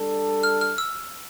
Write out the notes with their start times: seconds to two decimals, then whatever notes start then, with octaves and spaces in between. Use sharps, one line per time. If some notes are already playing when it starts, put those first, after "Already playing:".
Already playing: G3 D4 A4
0.43 F6
0.61 F6
0.78 E6